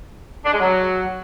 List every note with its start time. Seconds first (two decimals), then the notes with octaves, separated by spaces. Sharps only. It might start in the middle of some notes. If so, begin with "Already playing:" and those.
0.46 D4
0.53 G#3
0.60 F#3